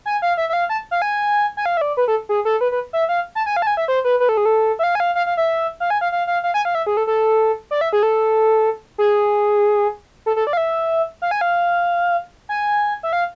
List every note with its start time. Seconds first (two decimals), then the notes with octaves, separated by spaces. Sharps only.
0.06 G#5
0.22 F5
0.37 E5
0.49 E5
0.53 F5
0.69 A5
0.91 F5
1.02 G#5
1.57 G#5
1.66 F5
1.77 E5
1.81 D5
1.97 B4
2.08 A4
2.29 G#4
2.45 A4
2.61 B4
2.72 B4
2.93 E5
3.09 F5
3.35 A5
3.46 G#5
3.57 F5
3.62 A5
3.67 G#5
3.77 E5
3.88 C5
4.05 B4
4.20 B4
4.29 A4
4.37 G#4
4.45 A4
4.79 E5
4.83 F5
4.95 G#5
5.00 F5
5.15 F5
5.26 F5
5.37 E5
5.80 F5
5.90 G#5
6.01 F5
6.12 F5
6.27 F5
6.44 F5
6.54 G#5
6.65 F5
6.75 E5
6.87 G#4
6.97 A4
7.07 A4
7.71 D5
7.81 E5
7.93 G#4
8.03 A4
8.98 G#4
10.26 A4
10.36 A4
10.47 D5
10.53 F5
10.57 E5
11.22 F5
11.31 G#5
11.41 F5
12.49 G#5
13.03 E5
13.13 F5